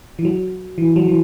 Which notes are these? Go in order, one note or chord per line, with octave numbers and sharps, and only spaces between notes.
E3
F#3
E3
F#3
E3